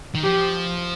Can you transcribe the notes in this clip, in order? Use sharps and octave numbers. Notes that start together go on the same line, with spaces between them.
D#3
F3 G4